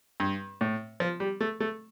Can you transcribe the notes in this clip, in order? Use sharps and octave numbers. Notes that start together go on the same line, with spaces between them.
G2
A2
F3
G3
A3
A3